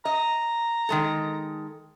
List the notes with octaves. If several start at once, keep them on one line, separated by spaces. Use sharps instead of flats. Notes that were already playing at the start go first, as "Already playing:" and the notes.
D#5 A#5
D#3 G#3 A4